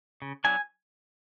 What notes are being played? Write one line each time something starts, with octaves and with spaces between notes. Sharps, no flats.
C#3
F#3 B3 D4 G#5